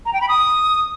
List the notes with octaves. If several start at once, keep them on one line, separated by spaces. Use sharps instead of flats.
A#5
G5
B5
D#6